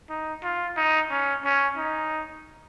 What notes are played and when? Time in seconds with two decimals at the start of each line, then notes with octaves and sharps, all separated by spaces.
0.10 D#4
0.44 F4
0.77 D#4
1.11 C#4
1.44 C#4
1.77 D#4